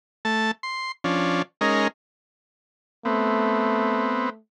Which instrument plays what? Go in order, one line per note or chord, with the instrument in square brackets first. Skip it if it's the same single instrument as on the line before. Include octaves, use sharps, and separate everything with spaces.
[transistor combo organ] A3 A5
C6
F3 C#4 D4
G#3 C#4 D#4 A#4
[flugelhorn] A3 [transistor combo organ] B3 C4